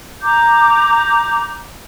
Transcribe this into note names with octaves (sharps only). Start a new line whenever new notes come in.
A#5 D6 G6